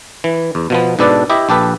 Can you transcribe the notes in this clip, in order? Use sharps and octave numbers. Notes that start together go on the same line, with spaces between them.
E3
E2
B2 F3 B3
G#2 B2 D4 A4 B4 D5
E4 G4 D#5 E5
A#1 G4 A4 B4